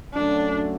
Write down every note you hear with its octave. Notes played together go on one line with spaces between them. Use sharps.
F#2 D3 F#3 A3 C#4 D4